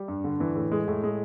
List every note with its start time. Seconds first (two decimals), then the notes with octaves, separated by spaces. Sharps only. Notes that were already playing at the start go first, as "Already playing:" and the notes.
Already playing: G3
0.08 G2
0.24 D3
0.40 E3
0.55 A2
0.72 G#3
0.88 A2
1.04 G#3